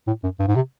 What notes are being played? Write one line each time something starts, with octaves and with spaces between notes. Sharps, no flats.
A2
F#2
G2
G#2
C3